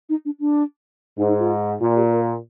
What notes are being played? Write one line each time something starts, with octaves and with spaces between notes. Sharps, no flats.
D#4
D4
D4
G#2 D#4
D#4
F4
A#2 F4
G4
A#4